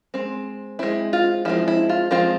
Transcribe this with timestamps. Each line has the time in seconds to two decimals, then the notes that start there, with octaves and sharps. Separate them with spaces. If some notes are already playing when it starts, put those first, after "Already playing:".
0.14 G#3 C4
0.79 G#3 C4 E4
1.13 F4
1.45 F3 G#3 C4 E4
1.68 E4
1.89 F4
2.11 F3 G#3 C4 F4